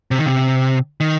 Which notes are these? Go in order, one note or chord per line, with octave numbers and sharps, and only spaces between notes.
C3
D#3
C3
D#3